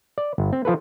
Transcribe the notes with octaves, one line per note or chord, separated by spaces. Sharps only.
D5
G1
C4
F3 F4 A4 B4